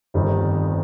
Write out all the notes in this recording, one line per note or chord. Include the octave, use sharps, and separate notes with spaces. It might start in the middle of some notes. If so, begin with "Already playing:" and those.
G1 F2 D#3 G3